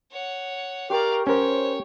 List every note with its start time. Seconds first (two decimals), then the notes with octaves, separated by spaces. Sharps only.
0.12 C#5 F#5
0.90 G4 A#4 D5 F5 G5 C#6
1.27 C#4 A#4 C5 C#5